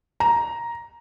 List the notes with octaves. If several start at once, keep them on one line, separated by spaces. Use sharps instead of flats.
A#5